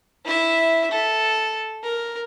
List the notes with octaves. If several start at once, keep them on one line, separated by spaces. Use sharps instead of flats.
E4 E5
A4
A#4